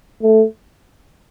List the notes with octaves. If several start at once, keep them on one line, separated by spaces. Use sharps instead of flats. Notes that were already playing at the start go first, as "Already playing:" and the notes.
A3